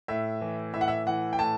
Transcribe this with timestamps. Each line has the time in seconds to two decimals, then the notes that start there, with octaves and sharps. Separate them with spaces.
0.08 A2 E5
0.41 E3
0.74 A2 E5
0.81 F#5
0.88 E5
1.06 E3 F#5
1.33 G5
1.39 A2 A5